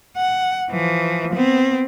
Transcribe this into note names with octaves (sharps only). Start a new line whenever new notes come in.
F#5
E3 F3
B3 C4